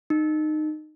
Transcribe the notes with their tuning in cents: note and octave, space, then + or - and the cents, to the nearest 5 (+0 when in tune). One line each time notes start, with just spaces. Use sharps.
D#4 -20